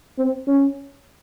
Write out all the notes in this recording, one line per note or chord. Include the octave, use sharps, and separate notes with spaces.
C4
C#4